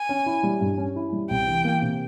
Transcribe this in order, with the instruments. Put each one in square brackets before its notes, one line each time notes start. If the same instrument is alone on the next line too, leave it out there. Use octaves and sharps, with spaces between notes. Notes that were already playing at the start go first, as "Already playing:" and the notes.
Already playing: [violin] G#5
[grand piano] C#4
E4
G3
G2
C#4
E4
G3
[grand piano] C2 [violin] G5
[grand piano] E3
A#3
C3